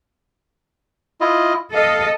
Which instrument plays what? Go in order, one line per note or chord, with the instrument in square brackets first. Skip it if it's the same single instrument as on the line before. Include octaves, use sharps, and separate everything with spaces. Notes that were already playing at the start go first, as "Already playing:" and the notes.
[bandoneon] E4 F4 D#5
[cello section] A4 D#5 [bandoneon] F5